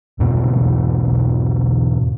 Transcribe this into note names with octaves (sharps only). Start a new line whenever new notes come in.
E2 G#2 B2 C4